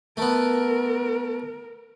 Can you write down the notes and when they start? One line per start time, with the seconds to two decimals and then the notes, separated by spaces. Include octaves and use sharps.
0.17 A3 B3 A#4